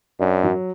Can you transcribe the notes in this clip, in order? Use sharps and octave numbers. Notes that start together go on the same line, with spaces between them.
F#2 D4
F#3